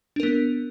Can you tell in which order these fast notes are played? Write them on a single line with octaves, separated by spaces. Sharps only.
D4 A#4 B3